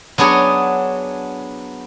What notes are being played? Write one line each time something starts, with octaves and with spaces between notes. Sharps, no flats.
F#3 B3 D4 G#4 C#5